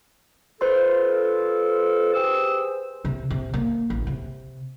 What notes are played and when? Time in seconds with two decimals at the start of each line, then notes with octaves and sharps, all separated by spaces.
0.61 F4 A4 B4 C5 C6
2.14 G4 G#4 E6
3.05 C3
3.30 C3
3.54 A#3
3.90 A1
4.07 C3